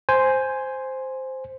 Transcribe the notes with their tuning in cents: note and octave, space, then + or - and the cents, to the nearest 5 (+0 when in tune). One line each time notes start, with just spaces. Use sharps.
C5 +0 G#5 +0